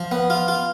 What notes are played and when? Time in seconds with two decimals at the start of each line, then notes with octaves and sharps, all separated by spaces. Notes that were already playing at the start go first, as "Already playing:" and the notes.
Already playing: F3
0.12 B3
0.30 F4
0.48 F4